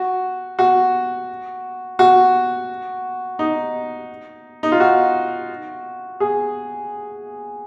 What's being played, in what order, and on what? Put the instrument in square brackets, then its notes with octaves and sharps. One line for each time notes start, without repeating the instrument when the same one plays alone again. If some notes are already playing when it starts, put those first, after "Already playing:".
Already playing: [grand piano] F#4
F#4
F#4
D#4
D#4
F4
F#4
G#4